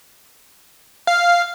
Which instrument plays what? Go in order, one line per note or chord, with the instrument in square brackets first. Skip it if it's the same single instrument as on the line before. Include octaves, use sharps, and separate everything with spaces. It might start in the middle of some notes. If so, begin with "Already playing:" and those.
[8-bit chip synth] F5